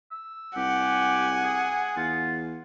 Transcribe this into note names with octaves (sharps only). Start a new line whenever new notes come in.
E6
C2 G4 F#5 G#5
G#4
E2 F4